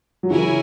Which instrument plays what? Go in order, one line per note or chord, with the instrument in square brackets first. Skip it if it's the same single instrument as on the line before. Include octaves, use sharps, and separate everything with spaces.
[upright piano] F#3
[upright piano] C#3 E3 [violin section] E4 A#4 C#5 G#5